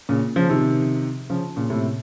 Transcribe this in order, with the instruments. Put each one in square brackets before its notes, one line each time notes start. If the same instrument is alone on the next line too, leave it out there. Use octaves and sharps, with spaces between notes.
[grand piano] A#2 C#3
C#3 F3
C3 D#3
C#3 F3
A#2 C#3
A2 C3